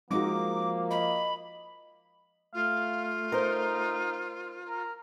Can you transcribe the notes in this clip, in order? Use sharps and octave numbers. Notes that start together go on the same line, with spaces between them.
F3 G#3 A#3 D#4 F#4 D6
D#5 B5
A3 F4 F5
D#4 A#4 C5
A#4